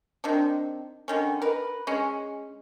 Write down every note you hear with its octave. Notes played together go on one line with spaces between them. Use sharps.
D#3 C4 D4
D3 D#3 C#4
A#4 B4
G#3 C#4